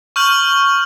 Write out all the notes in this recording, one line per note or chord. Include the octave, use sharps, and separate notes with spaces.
C#6 F6 G6 F#7